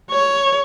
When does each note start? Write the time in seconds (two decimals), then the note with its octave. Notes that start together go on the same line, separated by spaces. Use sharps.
0.11 C#5